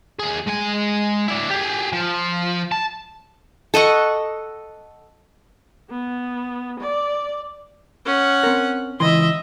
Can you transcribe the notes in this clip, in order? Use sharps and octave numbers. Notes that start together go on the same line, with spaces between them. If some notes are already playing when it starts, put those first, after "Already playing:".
D#2 G#4
G#3 G#5
D4 E4
G4 G#4
F3
A5
A4 D#5 F#5 C#6
B3
D5
C#4 F#5
C4 A#4
C#2 E3 D#5 E5 C6